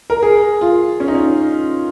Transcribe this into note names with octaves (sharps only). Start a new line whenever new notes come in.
A#4
G#4
F4
C#4
D#4
C#4